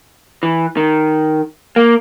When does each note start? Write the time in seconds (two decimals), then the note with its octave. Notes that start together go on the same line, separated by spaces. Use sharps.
0.43 E3
0.77 D#3
1.76 A#3